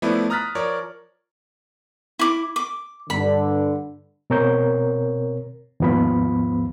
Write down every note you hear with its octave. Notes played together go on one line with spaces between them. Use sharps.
F3 A3 B3 E4 B4 D5
A#5 D#6 F6 F#6 A6 B6
F3 A#4 C#5 D5
E4 D6
D6
G2 D3 B5
B2 C4 A#4 C#5 G6
D#2 G#2 F3 B3 F4 B5